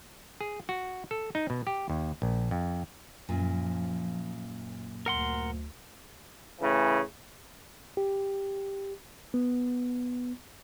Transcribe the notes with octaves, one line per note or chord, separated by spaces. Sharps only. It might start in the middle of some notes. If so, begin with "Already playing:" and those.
G#4
F#4
A4
D#4
B2
G4
D#2
A#1
F2
F#2 A#2 F3
D2 A#4 F#5 C6
A2 C#3 E3
G4
B3